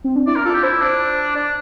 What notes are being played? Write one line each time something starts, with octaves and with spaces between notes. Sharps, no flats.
C4
D4
E4 D5
A#4
F4 A4
G4
E4 C5
D4
D4 D5